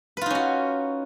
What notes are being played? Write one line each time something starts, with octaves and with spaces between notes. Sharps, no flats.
C#4 D#4 F4 F#4 B4